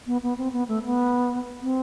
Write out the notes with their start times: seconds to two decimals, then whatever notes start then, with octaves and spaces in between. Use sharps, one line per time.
0.06 B3
0.23 B3
0.38 C4
0.53 B3
0.68 A3
0.85 B3
1.62 C4